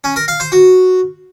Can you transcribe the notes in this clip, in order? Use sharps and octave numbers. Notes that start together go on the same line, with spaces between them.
C#4
A#4
F5
C5
F#4